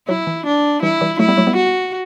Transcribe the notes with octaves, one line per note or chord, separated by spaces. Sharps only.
F#3 E4
E3
D4
E3 G3 E4
E3 G3
F#3 A3 E4
G3 B3
F#3 A3
G3 B3
F#4